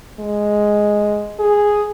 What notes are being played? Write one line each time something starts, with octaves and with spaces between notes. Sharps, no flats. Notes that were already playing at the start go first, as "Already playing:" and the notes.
G#3
G#4